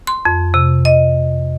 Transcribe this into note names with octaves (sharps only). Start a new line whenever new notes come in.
C6
F2
C3
D#5